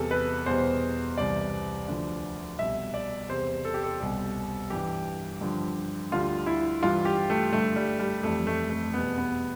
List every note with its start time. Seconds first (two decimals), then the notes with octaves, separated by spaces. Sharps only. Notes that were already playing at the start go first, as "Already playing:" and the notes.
Already playing: E2 C3 G3 A4
0.11 B4
0.46 E2 B2 G3 C5
1.18 C2 C3 E3 D5
1.87 D2 D3 F3
2.59 C2 B2 G3 E5
2.94 D5
3.29 E2 C3 G3 C5
3.65 A4
3.74 G4
3.84 A4
4.00 C2 B2 G3
4.70 G2 E3 G3 G4
5.41 G2 D3 F3
6.11 D2 D3 G3 F4
6.46 E4
6.82 G2 E3 G3 F4
7.05 G4
7.30 A3
7.53 G2 D3 G3 A3
7.76 G3
7.99 G3
8.23 F2 E3 G3 A3
8.47 A3
8.70 A3
8.94 E2 B2 G3 B3
9.18 B3